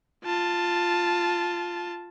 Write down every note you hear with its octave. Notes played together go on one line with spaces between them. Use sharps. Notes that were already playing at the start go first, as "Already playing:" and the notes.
F4 A5